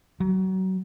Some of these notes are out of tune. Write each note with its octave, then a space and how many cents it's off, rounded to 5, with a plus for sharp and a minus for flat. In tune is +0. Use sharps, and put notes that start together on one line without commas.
F#3 +25